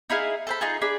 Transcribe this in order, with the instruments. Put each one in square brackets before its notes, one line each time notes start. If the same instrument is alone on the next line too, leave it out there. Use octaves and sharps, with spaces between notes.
[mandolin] D#4 E4 G#4 F5
A4 C5 B5
D#4 F4 G#4
D4 G#4 B5